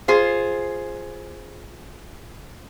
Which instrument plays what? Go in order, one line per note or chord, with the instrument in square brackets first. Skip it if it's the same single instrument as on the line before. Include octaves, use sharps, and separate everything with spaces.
[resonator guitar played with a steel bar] F4 G#4 C5